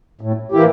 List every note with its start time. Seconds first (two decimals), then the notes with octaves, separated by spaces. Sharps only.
0.21 A2
0.52 E3 A#3 E4 G4